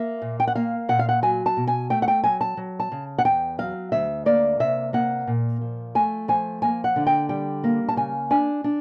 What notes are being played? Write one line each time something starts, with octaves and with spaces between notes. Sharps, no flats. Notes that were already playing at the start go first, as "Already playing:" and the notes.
Already playing: A#3 E5
A#2
G5
F#5
A#3 F5
A#2 F#5
F5
F#5
F#3 G#5
A5
B2
G#5
A3 G5
F#5
G5
F#3 G#5
A5
F#3
A5
C#3
F#5
E2 G5
F#3 F5
D2 E5
A#3 D5
C3 E5
A#3 F#5
A#2
F3
A3 G#5
F3 G#5
A#3 G#5
F#5
D3
G5
G3 G5
A#3
A5
C#3 G#5
D4 G#5
D4